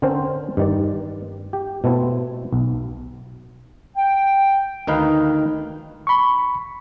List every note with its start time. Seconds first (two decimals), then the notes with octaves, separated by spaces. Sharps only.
0.02 D3 C4 C#4 A#4 C5
0.57 G2 D#3 D5
1.53 G4
1.84 B2 A3 C4 E4
2.53 B1
3.97 G5
4.87 D2 D#3 D#4 B4 F5
6.07 B5 C#6